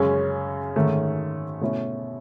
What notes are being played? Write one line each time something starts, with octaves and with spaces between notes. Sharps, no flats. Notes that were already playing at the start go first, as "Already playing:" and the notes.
Already playing: F#2 C#3 G#3 C#4
G#2 D#3 A3 C#4
B2 A3 C#4 E4